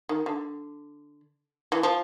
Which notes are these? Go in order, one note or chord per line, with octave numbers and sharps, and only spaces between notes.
D#3
D3
E3
F3